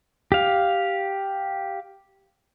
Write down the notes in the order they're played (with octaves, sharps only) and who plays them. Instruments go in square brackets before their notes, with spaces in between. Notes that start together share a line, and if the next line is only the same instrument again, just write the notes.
[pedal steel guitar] G4 F5